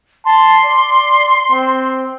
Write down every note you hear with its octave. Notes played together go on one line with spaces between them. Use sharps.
A5 C6
D5
C4